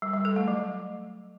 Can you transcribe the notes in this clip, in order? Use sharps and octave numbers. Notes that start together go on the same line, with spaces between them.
G3
G3
A4
A3
F#3